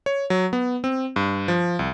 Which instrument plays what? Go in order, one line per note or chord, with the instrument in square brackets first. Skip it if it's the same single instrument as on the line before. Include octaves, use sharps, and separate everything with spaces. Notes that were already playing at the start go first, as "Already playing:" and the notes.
[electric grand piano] C#5
F#3
B3
C4
G2
F3
C2